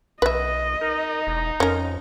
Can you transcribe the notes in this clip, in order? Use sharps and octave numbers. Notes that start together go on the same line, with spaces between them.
B1 B4 D#5 E5
D#4 A#4
E1
F2 C#4 A#4